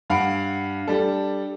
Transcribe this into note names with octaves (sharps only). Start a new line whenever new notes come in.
G2 F5 F#5 B5 D7
G3 D4 A4